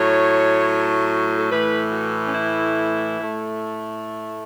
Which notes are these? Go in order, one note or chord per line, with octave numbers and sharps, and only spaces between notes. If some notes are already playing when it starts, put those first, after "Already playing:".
Already playing: A2 F#3 A3 C#5
A4
A2 E3 A3 B4
F#4
C#4
E4
A2 A3